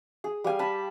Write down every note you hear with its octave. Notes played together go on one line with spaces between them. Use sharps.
G#4
G3 F5 G#5
A5 B5